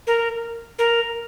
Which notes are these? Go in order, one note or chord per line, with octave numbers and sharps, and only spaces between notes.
A#4
A#4